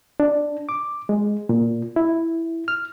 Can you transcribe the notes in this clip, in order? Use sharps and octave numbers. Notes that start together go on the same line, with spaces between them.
D4
D6
G#3
A#2
E4
F6